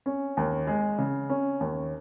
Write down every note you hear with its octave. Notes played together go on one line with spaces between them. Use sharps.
C#4
D#2
G#3
C#3
C#4
D#2